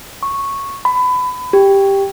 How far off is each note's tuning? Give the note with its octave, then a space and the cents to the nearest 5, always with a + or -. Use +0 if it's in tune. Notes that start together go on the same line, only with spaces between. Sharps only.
C#6 -5
B5 +25
G4 +5